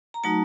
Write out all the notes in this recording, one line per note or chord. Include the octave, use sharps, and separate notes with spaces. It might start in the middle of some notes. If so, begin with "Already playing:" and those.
A#5
F#3 A3 D#4 F#4 A5